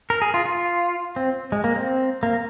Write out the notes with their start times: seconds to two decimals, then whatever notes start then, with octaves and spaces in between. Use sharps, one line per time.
0.10 A#4
0.22 G#4
0.34 F4
0.45 F4
1.16 C4
1.52 G#3
1.64 A#3
1.76 C4
2.23 A#3